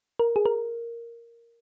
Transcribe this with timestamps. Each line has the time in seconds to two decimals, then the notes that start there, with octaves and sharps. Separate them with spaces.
0.19 A#4
0.36 G#4
0.46 A#4